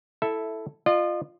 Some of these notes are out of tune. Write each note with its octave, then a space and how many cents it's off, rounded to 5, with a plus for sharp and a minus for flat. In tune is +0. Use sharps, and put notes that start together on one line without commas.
E4 -5 A4 +0 E5 +0
F4 +0 D#5 -40